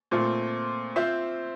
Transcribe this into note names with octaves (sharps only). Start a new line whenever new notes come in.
A#2 A3 C4 F4
C4 F4 C5 E5